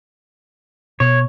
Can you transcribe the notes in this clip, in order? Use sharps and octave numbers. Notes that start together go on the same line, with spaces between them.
B2 C#5